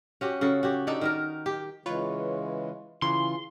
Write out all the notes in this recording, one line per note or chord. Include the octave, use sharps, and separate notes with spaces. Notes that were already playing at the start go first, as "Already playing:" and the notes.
C#4 F#4 G4
C#3 F#4 A4
F#4 G4
D4 D#4 A4
D#3 D#4 A#4
G4
C#3 E3 G#3 F4 B4 C#5
C#3 E3 F4 C6